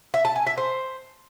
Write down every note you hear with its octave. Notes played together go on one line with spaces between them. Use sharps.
E5
A5
G#5
E5
C5